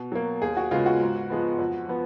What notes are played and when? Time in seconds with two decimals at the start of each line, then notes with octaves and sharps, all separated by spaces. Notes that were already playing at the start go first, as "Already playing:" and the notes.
Already playing: B2
0.12 F#3 A#3
0.42 D#2 G#4
0.57 F#4
0.71 C#3 G#3 B3 F4
0.86 F#4
1.00 G#2
1.30 F3 G#3 B3
1.59 F2
1.88 F3 B3